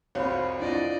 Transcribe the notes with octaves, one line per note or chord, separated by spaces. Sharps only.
C2 F2 F#4 C5 C#5 F5 B5
D4 E4 F4 D5 D#5